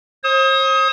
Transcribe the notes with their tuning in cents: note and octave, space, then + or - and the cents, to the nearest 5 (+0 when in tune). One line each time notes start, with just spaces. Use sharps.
C5 +40 D#6 +25